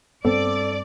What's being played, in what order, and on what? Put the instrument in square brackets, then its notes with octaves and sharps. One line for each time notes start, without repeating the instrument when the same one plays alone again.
[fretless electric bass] G2 C4 [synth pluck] B3 [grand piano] A4 [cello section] D5